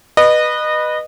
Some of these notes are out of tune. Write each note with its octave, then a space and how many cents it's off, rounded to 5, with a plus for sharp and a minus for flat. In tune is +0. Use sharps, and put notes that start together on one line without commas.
B4 -10 D#5 -25